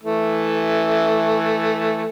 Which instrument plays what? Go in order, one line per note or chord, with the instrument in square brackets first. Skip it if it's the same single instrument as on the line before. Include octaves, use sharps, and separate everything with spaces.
[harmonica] E3 A3